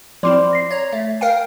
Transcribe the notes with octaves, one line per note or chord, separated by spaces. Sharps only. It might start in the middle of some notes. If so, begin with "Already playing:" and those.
F3 C4 E4 D5 C6 D6
A#6 C7
C#5 A#5
A3
A#4 F5 G5